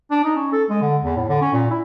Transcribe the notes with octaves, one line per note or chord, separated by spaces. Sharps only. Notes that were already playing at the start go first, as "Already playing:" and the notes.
D4
D#4
C#4
A4
G#3
D3
E2
A2
D3
C#4
A#2
E4